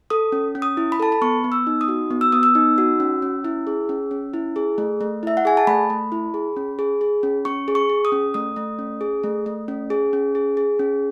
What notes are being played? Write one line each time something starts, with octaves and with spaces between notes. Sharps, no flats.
A4 D#6
C#4
C#4
D#6
E4
B5
A4 A5
B5
B3 C#6
B3
E6
D#4
D#6
F#4
B3
E6
B3 D#6
E6
D#4
F#4
C#4
C#4
E4
G#4
C#4
C#4
E4
G#4
A3
A3
E4 E5
F#5
G#4 G#5
A5
A3 B5
A3
E4
G#4
C#4
G#4
G#4
C#4
C#4 C#6
G#4
C#6
G#4
D#6
C#4
A3 D#6
A3
C#4
G#4
A3
A3
C#4
G#4
C#4
G#4
G#4
C#4